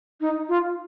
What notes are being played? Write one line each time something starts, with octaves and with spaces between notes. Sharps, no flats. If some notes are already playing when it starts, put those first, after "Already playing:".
D#4
F4